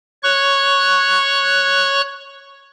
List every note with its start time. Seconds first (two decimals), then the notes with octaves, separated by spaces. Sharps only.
0.23 C#5 C#6 F#6